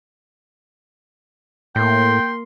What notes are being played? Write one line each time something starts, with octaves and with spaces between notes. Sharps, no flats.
A2 A#3 G5 C6